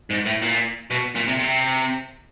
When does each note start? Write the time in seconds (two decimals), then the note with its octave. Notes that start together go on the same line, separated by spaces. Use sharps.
0.10 G#2
0.26 A2
0.42 A#2
0.91 B2
1.15 A#2
1.27 C3
1.39 C3